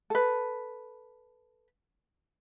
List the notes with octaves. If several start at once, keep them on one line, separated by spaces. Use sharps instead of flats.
A4 B4